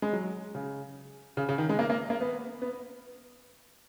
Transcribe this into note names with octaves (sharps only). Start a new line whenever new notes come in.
G#3
F#3
C#3
C#3
C#3
D#3
G#3
A#3
A#3
A#3
B3
B3